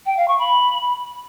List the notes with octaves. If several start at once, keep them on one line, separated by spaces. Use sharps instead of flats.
G5
F5
C#6
B5